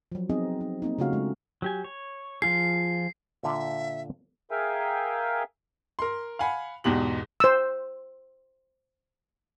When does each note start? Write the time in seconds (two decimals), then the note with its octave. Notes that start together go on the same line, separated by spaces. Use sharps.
0.12 F3 F#3
0.29 B3 C4 D#4 G#4 D#5
0.61 D#4
0.82 A#3 C4 D#4
0.98 C#3 A3 C#4 F4 F#4 F5
1.13 G#3
1.62 F#3 G4 G#5
1.84 C#5
2.42 F3 F4 G#4 C7
3.43 A#2 D3 F4 E5
4.51 G#4 A#4 E5 F5 G5 G#5
5.99 A#4 C6
6.39 F5 F#5 G#5 B5
6.84 E2 G#2 B2 G4 F#7
7.40 C5 E6